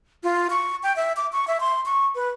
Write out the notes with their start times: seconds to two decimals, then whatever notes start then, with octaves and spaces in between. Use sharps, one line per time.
0.24 F4
0.50 C#6
0.83 G5
0.96 E5
1.17 D6
1.33 C#6
1.48 E5
1.60 C6
1.86 C#6
2.15 B4